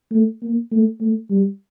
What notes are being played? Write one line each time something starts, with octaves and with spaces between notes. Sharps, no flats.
A3
A#3
A3
A3
G3